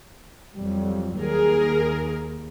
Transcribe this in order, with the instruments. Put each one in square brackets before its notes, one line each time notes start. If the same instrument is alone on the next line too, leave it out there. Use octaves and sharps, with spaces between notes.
[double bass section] F2 F#3 G3
[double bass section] D#2 [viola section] G#4 A#4